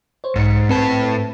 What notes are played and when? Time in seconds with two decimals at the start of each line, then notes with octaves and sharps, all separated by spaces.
0.24 C5 C#5
0.36 B1 G#2 C#7
0.69 A2 C4 B4 A5